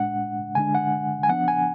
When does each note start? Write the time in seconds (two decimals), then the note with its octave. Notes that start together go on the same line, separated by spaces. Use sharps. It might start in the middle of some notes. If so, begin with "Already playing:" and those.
Already playing: A2 G#3 D4 F#5
0.55 D3 G#3 D4 G#5
0.75 F#5
1.23 G#5
1.29 F3 B3 D4 F#5
1.48 G#5